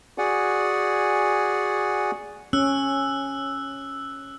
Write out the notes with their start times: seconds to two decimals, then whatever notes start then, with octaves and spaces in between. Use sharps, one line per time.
0.18 F#4 G#4 D5 F#5 G#5
2.53 C#4 E6 F#6